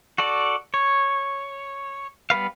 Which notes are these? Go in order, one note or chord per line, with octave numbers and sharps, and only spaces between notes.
F#4 A4 D5
C#5
G3 B3 B4 F5